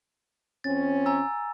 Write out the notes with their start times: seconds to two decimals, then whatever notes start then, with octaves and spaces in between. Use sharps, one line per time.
0.64 F2 C4 C#4 A6
1.06 G#5 A#5 E6